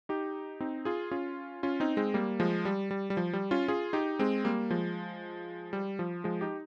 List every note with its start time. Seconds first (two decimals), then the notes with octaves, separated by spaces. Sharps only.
0.09 D#4 G4
0.61 C4 D#4
0.85 F4 G#4
1.11 C#4 F4
1.63 C#4 F4
1.80 C4 D#4
1.97 G#3 C4
2.14 G3 A#3
2.40 F3 G#3
2.65 G3
2.91 G3
3.10 G3
3.17 F3
3.33 G3
3.51 C#4 F4
3.68 F4 G#4
3.93 D#4 G4
4.19 G#3 C4
4.44 G3 A#3
4.70 F3 G#3
5.73 G3
5.99 F3
6.24 F3 G#3
6.41 D#4 G4